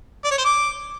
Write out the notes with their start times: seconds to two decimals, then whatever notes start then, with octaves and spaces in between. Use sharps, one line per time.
0.24 D5
0.31 C#5
0.38 C5
0.45 D6